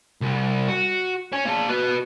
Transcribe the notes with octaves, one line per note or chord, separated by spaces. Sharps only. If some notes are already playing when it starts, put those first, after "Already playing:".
C2
F#4
C#5 G#5
A#3 A5
F#4 B4